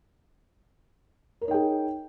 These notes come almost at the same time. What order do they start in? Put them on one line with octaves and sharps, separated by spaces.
A#4 C#5 D#4 G5 G#4